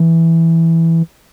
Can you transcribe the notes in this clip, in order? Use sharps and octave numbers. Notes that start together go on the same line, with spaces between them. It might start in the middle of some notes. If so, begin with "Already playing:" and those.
Already playing: E3